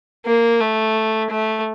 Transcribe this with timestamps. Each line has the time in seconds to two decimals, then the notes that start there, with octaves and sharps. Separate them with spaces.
0.26 A#3
0.60 A3
1.30 A3